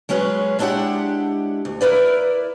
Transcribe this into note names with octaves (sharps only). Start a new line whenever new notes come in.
F#3 G#3 C#4 G#4 B4
G#3 D4 E4 G4 F#5
D2
E4 A#4 B4 D5